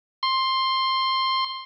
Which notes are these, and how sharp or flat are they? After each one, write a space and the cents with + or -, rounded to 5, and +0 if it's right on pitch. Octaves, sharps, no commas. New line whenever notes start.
C6 +10